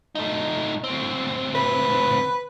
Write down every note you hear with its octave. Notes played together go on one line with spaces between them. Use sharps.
A3 D#4
D2 C4
B4